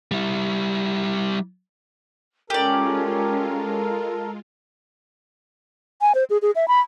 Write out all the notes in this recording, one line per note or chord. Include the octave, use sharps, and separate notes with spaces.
G3 E4
G#3 C#4 F4 G4 A4 A#4 D5
G#5
C5
G#4
G#4
E5
B5